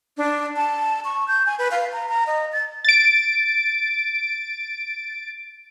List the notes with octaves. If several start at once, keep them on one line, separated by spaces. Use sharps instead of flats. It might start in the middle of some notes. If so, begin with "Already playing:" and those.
D4
A5
C#6
G6
G#5
B4
F5
A#5
A#5
D#5
A6
A6 D7